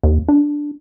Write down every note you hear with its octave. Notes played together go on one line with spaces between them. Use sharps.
D#2
D4